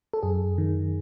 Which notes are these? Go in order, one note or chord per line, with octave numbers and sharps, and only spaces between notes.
A4
F#2 G#4
D#3